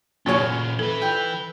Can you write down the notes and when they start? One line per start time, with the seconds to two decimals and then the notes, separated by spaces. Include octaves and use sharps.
0.26 F#2 A#2 C#3 A#3 C#4 C#5
0.79 E3 A4 B4
1.02 G5